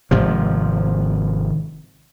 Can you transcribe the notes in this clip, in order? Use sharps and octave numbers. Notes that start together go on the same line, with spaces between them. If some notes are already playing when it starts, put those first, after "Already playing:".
G#1 C3 F3